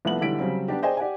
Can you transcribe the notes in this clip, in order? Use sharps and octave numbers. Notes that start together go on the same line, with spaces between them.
C2 F3 A3 B3 F#7
B1 D3 E3 G3 B6 D7
C#3 F#3 G3 C4
B3 D4 G4
G#4 C5 D5 D#5 G5 G#5
G4 D5 F#5 G#5